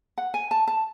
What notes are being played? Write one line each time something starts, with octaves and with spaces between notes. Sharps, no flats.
F#5
G#5
A5
A5